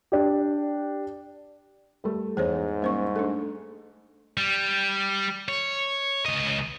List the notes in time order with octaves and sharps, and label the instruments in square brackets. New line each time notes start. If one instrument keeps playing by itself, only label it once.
[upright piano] D4 G4
[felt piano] G3 A3
[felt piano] E2 [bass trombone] G#2 [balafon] G#4 C5 C#5
[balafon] G3 C5 C#6 [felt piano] A#3 C#4
[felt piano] A3 [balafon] D4 A4
[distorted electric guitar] G3
C#5
C#2 D#5